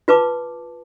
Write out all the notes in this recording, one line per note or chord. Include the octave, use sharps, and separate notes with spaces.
F4 B4 A5 D6